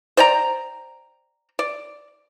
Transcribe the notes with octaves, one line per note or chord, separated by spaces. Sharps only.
C5 D5 G5 A#5
D5